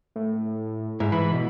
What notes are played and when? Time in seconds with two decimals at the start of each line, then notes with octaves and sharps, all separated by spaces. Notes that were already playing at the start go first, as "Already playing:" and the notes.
0.16 A2
1.00 G#2 E4
1.12 E3 B5
1.32 B2